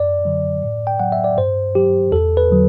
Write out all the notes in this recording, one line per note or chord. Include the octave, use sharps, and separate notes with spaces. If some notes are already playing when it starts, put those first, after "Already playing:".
Already playing: F#2 D5
D3 F#3
A2
G5
F#3 F#5
E5
D5
G2 C5
F#3 G4
E2 A4
B4
D3 F#3